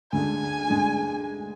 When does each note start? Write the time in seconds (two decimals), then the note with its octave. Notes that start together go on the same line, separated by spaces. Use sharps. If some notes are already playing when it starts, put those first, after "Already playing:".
0.12 D2 D3 G#3 D4 G#5
0.68 D2 D3 G#3 D4